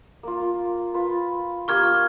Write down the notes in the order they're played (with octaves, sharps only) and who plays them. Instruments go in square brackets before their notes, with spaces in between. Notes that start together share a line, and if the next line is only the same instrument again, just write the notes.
[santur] A#3 F4
F4 B4
[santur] A#3 F4 G4 [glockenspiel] C#6 F6 G#6